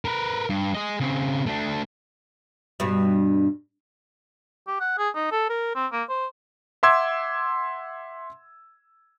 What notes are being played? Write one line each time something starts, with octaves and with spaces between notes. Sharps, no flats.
A#4 B4
G2
G#4 D#5
C#3 C4
A3 D4
G2 B2
G4
F#5
G#4
D#4
A4
A#4
C4
A#3
C5
E5 F#5 C6 D6 E6 G#6